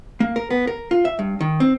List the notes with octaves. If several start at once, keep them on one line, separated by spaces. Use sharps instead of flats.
A#3
A#4
B3
A#4
F4
E5
G2
D#3
C4